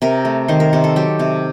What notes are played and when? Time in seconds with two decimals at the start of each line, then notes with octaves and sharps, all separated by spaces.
0.02 C3 A#4
0.25 A3
0.48 D#3 C5
0.60 A#4
0.73 C3 C5
0.84 A4
0.96 F#3 G4
1.19 C3